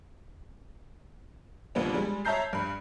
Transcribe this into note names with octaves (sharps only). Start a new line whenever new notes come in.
D#2 A#2 G3 B3 D4
G3 G#3
C#5 E5 A5 A#5 G6 C7
G2 B5